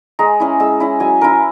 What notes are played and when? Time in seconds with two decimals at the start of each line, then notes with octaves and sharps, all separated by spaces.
0.19 G#3 A#5
0.40 C#4 E4
0.60 G#3 E6
0.80 C#4 E4
1.00 F#3 G#5
1.21 C#4 E4 A#4